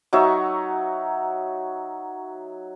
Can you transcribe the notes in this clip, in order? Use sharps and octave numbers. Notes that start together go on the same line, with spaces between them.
F#3 D#4 E5 C#6